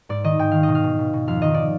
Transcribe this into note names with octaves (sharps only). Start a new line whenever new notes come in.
G#2 D5
D#3 D#5
G#2 G5
D#3 F5
D#5
B2
F5
B2
B2
B2
F2 F5
D#3 D#5
D5